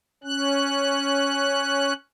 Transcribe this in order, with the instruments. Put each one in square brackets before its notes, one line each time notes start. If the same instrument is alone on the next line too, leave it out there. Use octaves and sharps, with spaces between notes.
[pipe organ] C#4 F#6